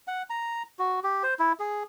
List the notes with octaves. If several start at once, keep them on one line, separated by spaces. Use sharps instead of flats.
F#5
A#5
F#4
G4
C5
E4
G#4